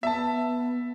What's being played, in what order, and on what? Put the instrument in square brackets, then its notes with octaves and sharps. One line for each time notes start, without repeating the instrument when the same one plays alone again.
[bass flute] B3 [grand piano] E5 A5